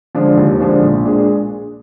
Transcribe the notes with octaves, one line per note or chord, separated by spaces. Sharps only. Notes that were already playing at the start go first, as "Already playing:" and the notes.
D3 F3 G#3 D4
D#2
D3 F3 G#3 D4
A#1
A#2 G#3 D4 G#4